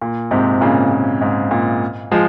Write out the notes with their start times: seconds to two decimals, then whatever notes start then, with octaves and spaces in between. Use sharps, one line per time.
0.02 A#2
0.31 G#2 C3
0.61 A#2 C#3
0.91 A#2
1.21 G#2
1.51 A#2
2.11 F3 G#3